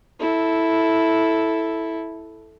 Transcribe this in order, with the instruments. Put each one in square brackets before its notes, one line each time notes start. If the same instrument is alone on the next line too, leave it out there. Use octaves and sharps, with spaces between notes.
[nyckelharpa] E4 A4